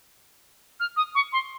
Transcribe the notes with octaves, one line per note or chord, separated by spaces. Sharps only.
F6
D#6
C#6
C6